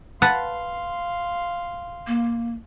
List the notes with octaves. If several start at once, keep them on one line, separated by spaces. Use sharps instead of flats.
B4 F5 F#5 A5 C6
A#3